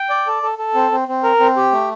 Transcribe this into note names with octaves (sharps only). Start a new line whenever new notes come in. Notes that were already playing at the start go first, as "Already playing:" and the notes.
Already playing: G5
D5
A4
A4
A4
C4
C4
C4
A#4
C4
G4
A3